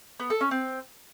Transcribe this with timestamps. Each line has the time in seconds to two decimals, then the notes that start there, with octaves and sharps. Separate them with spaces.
0.20 B3
0.30 A4
0.41 C#4
0.51 C4